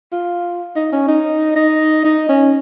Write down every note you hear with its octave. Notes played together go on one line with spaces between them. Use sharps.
F4
D#4
C#4
D#4
D#4
D#4
C#4